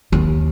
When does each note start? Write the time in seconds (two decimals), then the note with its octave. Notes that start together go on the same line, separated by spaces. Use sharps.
0.12 D#2